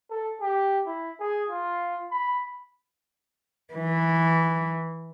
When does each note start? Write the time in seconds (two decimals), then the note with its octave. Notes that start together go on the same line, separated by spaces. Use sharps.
0.11 A4
0.41 G4
0.87 E4
1.20 G#4
1.50 F4
2.11 B5
3.75 E3